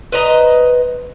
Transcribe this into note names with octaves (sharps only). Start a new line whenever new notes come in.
B4 C5 D#5 A#5